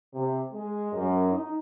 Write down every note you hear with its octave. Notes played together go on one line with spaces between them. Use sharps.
C3
G#3
F#2
D#4